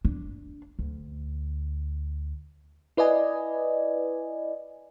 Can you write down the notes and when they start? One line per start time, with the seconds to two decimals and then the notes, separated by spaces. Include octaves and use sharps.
0.05 D4
0.79 D2
2.97 E4 B4 D5 D#5 G#5